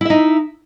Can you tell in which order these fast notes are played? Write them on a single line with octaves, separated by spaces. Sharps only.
E4 E5 D#4